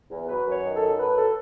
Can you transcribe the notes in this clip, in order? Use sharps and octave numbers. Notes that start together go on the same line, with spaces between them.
E2
F#3 B4
F#2
C#5
D#3
A4
F#2
F#3 B4
A4